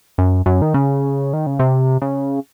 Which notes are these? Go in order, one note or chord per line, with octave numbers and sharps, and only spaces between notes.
F#2
F#2
D#3
C#3
D#3
C#3
C3
C#3